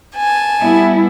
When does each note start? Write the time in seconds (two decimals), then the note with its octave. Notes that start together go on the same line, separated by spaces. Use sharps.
0.15 G#5 A5
0.60 G3 B3 E4